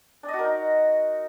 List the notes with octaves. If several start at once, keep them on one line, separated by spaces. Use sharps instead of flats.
D4
D#5
F#4
A#4
D#4